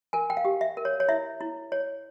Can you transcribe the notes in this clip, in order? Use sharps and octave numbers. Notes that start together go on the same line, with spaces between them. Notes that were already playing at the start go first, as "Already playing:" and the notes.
A#4 G#5
G5
F5
G4
E5
A#4
C#5
C#5
E4 E5
E4
C#5